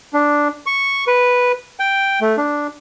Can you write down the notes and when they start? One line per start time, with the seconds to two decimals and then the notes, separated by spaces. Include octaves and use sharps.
0.14 D4
0.66 C#6
1.07 B4
1.80 G5
2.21 A3
2.37 D4